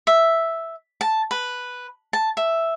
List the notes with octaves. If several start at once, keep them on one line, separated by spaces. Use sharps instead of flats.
E5
A5
B4
A5
E5